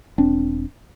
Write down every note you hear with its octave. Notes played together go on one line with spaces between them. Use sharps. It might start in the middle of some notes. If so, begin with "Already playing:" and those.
E1 C4 D4